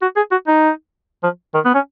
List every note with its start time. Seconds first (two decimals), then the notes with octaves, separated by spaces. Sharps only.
0.02 F#4
0.16 G#4
0.31 F#4
0.47 D#4
1.23 F3
1.54 D#3
1.65 B3
1.75 C#4